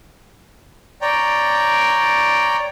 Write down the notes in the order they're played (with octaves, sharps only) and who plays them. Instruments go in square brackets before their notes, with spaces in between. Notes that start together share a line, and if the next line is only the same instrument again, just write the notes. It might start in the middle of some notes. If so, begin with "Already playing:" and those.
[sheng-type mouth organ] C#5 D5 G5 A#5